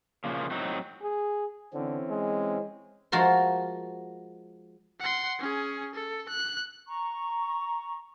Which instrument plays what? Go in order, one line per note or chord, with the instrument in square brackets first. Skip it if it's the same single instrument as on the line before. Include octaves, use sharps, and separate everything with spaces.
[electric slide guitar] A#2 C#3 F3 A#3
A2 F#3 C4 D#4
[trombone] G#4
[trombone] D3 [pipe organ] E3 C4 C#4
[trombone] G#3
[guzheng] F3 G#3 F#4 A#4 A5 C6
[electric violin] F#5 C6
C#4 G#4
A4
F#6
[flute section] A#5 C#6